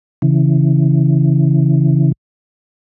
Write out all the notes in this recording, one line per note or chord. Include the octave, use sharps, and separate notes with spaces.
C#3 E3